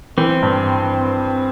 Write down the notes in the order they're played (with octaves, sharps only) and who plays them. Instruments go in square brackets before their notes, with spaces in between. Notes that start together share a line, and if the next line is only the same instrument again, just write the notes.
[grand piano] E3 [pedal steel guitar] C4
[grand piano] G2